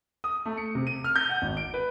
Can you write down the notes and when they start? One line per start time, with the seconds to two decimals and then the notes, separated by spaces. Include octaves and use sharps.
0.24 D#6
0.46 A3
0.57 C#7
0.75 C3
0.87 D#7
1.04 F6
1.16 G6
1.29 F#5
1.42 G#1
1.57 D7
1.74 B4